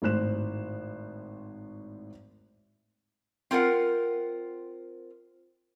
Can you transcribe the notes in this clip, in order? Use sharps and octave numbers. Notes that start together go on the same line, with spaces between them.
G#1 A2 C5 F#6 E7
C4 F4 A#4 F#5